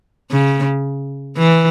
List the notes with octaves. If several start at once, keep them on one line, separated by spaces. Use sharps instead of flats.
C#3
E3